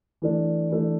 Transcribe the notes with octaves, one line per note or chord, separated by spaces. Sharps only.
E3 A3 D4
E3 A3 D4